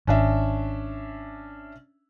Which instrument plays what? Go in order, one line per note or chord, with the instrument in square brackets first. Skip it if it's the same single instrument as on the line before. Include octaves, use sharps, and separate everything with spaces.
[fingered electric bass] G#1 [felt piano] C#4 D4 E5